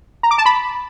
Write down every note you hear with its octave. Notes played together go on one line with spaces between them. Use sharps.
A#5
D6
A5
B5